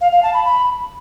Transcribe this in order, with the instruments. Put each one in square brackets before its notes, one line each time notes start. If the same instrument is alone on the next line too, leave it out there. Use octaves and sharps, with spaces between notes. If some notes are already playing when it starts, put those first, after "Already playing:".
[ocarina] F5
F5
A5
B5
B5